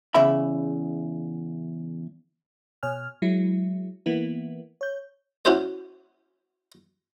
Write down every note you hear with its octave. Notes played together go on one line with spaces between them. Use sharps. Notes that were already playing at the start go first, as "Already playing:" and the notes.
E2 C#3 E5 B5
B2 C#5 G#5 F6
F#3 G#3 E4
E3 A#3 B3 E4
C#5 G6
C#4 E4 F#4 G4 C5 C#5